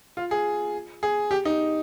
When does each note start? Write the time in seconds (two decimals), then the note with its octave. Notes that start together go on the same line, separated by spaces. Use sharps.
0.17 F4
0.31 G#4
1.03 G#4
1.31 G4
1.45 D#4